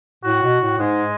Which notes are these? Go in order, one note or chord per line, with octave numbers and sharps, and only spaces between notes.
A2 F#4
B2
A2
G#2 G#3